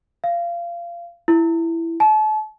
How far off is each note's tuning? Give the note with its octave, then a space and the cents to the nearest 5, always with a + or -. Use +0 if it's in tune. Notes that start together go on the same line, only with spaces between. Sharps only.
F5 -25
E4 +10
A5 -35